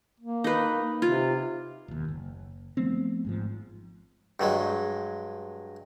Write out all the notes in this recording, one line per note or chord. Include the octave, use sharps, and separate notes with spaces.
A#3
D#4 B4
C3 F4
E1 D#2
F#1
F3 A3 B3 C4
G#1 G#2 F3
G2 F#3 G#3